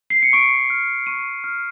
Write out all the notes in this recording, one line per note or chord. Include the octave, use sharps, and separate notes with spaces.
C7
C#7
C#6 D7
F6
C#6 D#7
F6